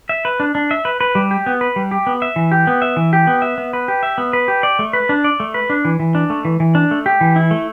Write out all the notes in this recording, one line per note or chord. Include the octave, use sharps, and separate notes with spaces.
E5
B4
D4
D4
E5
B4
B4
G3
G4
B3
B4
G3
G4
B3
E5
E3
G4
B3
E5
E3
G4
B3
E5
B3
B4
G4
E5
B3
B4
G4
D5
A3
B4
D4
D5
A3
B4
D4
E3
E3
D4
A3
E3
E3
D4
A3
G4
E3
E4
A3